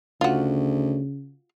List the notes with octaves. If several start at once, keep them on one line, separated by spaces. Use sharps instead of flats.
D2 C#3 F4 F#4